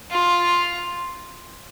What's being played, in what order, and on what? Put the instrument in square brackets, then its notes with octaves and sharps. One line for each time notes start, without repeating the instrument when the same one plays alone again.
[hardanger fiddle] F4